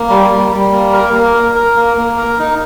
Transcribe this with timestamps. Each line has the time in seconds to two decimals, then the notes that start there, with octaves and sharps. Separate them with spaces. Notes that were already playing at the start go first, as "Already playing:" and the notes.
Already playing: A#3
0.09 G3
0.30 G3
0.51 G3
0.72 A#3
0.93 A#4
1.14 A#3
1.35 A#4
1.55 A#4
1.76 A#3
1.97 A#3
2.18 A#4
2.39 D#4